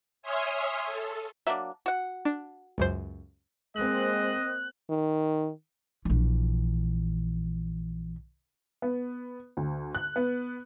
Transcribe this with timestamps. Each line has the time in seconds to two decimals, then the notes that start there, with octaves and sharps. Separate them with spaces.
0.22 C#5 E5 G#5 C6 D#6 F6
0.85 A4
1.47 F#3 A#3 D4 E5
1.86 F#4 F#5
2.25 D4
2.78 C#2 F#2 C5
3.76 G#3 A#3 C4 D#5 F#6
4.90 D#3
6.05 A#1 E3
8.82 B3
9.57 D2
9.95 F#6
10.16 B3